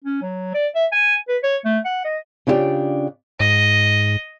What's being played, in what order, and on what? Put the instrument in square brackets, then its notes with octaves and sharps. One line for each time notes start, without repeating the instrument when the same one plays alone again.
[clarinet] C#4
F#3
D5
E5
G#5
B4
C#5
A3
F#5
D#5
[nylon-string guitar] C#3 D4 E4 F4 G4 D5
[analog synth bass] G#2 [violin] D#5